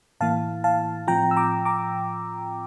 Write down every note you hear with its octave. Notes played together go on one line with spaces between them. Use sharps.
A2 E3 A#3 E4 F5 A5
F5 A5
A2 F3 C4 F4 G5 A#5
E6
A#5 D6
A#5 D6